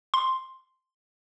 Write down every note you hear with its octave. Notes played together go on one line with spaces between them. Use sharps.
C6